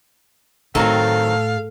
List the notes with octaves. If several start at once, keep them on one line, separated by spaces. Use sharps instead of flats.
A2 D#3 F#3 C4 A4 F5